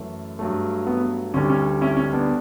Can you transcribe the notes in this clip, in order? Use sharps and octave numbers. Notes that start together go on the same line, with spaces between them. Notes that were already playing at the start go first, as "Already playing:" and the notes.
Already playing: F#2 E3 A3
G2 F#3 A3
B3
D2 D3 G3 C#4
C#4
C#4 E4
C#4
B3 D4